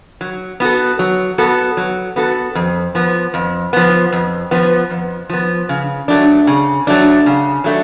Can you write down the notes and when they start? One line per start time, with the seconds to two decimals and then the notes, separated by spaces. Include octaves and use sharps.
0.21 F#3
0.60 B3 F#4 A4
0.99 F#3
1.38 B3 F#4 A4
1.77 F#3
2.16 B3 F#4 A4
2.55 F2
2.95 F3 B3
3.34 F2
3.73 F3 B3
4.12 F2
4.51 F3 B3
4.90 F2
5.30 F3 B3
5.69 C#3
6.08 F#3 A3 D4
6.47 C#3
6.87 F#3 A3 D4
7.26 C#3
7.64 F#3 A3 D4